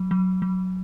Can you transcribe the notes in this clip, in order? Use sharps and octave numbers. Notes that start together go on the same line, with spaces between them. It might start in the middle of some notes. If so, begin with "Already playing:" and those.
Already playing: F#3
F#3
F#3